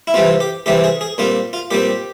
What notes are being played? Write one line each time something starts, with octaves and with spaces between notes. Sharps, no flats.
E4
C3 E3 G3 C4 F4
G4
C3 E3 G3 C4 G4
G#4
G#4
A#2 G3 C4 F4
F4
A#2 G3 C4 G4